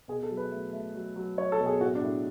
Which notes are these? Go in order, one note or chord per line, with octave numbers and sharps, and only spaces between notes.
B2 G#4
A4
F#3
B4
A3
A3
F#3
F#3
F#3 C#5
A4
B2
G#4
A2 F#4
D4
A2